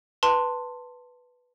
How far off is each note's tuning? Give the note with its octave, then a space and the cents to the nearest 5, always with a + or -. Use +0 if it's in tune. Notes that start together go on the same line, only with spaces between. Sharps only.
B4 +0 A5 +20 C6 +0